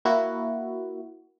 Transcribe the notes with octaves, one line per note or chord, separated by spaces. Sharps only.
A#3 E4 F#4